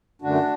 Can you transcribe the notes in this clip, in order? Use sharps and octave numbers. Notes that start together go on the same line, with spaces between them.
F#2 D3 A3 D4 F#4